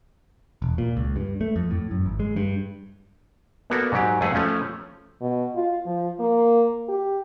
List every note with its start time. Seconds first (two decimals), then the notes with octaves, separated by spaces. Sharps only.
0.62 E1
0.78 A#2
0.97 C#2
1.16 G2
1.41 A3
1.56 F2
1.71 A2
1.91 F#2
2.06 G#1
2.20 G#3
2.36 G2
3.70 A#3 B3 F#4 A4 D5
3.92 G#2 F#3 G4
4.21 F2 A3 G#4 B4 F#5 G#5
4.35 F3 A3 C#4
5.21 B2
5.55 F4
5.86 F3
6.19 A#3
6.89 G4